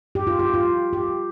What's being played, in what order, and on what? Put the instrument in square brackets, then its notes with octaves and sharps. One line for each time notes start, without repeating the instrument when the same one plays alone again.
[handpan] G4
F4
G4
F4
G4